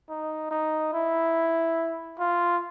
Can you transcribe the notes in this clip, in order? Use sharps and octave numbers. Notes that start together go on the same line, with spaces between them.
D#4
D#4
E4
F4